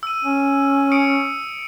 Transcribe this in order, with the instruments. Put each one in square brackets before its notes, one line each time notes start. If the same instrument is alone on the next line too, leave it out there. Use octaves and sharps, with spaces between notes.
[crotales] E6 D#7
[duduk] C#4
[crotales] D#6 C#7 D7